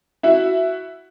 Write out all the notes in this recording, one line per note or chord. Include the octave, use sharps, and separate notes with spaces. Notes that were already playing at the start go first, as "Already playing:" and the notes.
E4 F#4 E5